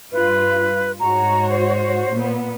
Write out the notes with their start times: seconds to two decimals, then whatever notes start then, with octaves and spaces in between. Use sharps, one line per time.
0.12 G2 F4 B4
1.00 G#2 F#4 C#5 A#5
1.49 C5
2.11 A#2 B3